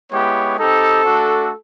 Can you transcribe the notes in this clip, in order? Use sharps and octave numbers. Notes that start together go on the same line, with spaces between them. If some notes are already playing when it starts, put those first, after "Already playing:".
G#3 B3 E4 G4 C#5
C4 D#4 G4 A4
A3 D4 F#4